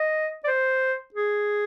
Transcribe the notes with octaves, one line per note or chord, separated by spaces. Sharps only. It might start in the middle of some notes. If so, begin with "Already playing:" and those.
Already playing: D#5
D5
C5
G#4